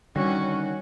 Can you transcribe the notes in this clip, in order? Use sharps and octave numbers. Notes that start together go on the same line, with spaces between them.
D3 D#3 G3 C#4 F#4